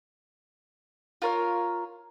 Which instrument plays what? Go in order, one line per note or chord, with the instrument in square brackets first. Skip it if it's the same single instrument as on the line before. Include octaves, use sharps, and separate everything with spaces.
[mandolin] F4 A#4 C#5 F5